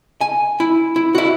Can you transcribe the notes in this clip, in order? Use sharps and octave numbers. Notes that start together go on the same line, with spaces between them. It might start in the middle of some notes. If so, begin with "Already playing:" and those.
G#5
E4
E4
E4 F#4